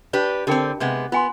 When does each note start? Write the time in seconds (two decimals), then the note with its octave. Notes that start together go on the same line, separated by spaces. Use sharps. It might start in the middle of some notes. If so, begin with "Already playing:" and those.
0.13 D4 G4 B4
0.47 D3 C4 G4 A#4 G5
0.80 C3 G#3 B3
1.12 B3 F4 G#5 C6